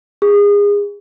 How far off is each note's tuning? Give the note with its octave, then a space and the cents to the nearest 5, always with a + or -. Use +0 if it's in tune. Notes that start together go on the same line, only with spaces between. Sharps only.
G#4 -30